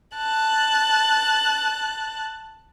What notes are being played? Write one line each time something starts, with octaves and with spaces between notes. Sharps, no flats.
A5 F#6